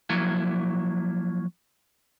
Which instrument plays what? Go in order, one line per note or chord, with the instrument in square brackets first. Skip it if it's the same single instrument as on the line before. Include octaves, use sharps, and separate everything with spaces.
[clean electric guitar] F3 F#3 A#3 E4